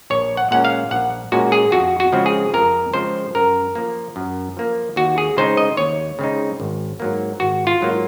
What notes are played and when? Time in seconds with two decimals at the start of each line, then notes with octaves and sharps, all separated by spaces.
0.10 A#1 C#5
0.37 F#5
0.51 A#2 G#3 C#4 F#5
0.65 F5
0.91 A#1 F#5
1.32 A#2 G#3 C#4 F#4
1.52 G#4
1.72 F2 F#4
2.00 F#4
2.12 C#3 F3 G#3 C4
2.26 G#4
2.54 F2 A#4
2.94 C#3 F3 G#3 C4 C5
3.35 F#2 A#4
3.75 F3 A#3
4.16 F#2
4.57 F3 A#3
4.96 D#2 F#4
5.18 G#4
5.37 C#3 G#3 C4 D#4 C5
5.57 D#5
5.77 D#2 C#5
6.19 C#3 G#3 C4 D#4
6.60 G#1
7.00 G#2 F#3 A#3
7.40 G#1 F#4
7.67 F4
7.81 G#2 F#3 A#3